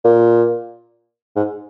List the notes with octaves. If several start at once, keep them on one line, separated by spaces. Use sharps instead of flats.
A#2
G#2